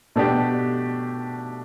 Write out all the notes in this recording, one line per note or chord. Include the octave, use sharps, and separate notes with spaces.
B2 A3 D4 G4